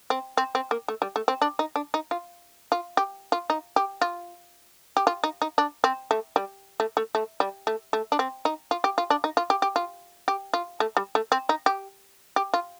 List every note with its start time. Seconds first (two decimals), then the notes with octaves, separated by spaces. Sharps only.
0.10 C4
0.37 C4
0.55 C4
0.71 A#3
0.88 A3
1.02 G3
1.16 A3
1.28 C4
1.42 D4
1.59 D#4
1.76 D4
1.94 D#4
2.11 F4
2.72 F4
2.97 G4
3.32 F4
3.50 D#4
3.76 G4
4.02 F4
4.97 G4
5.07 F4
5.24 D#4
5.42 D#4
5.58 D4
5.84 C4
6.11 A3
6.36 G3
6.80 A3
6.97 A3
7.15 A3
7.40 G3
7.67 A3
7.93 A3
8.12 D4
8.19 C4
8.45 D#4
8.71 F4
8.84 G4
8.98 F4
9.10 D4
9.24 D#4
9.37 F4
9.50 G4
9.62 G4
9.76 F4
10.28 G4
10.54 F4
10.80 A3
10.97 G3
11.15 A3
11.32 C4
11.49 D#4
11.66 G4
12.36 G4
12.54 F4